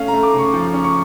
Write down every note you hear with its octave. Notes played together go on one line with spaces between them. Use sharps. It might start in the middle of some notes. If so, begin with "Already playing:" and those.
Already playing: A3 C#4 F5
A#5
A3
D6
C#3 C#6
F3
C#4
C#6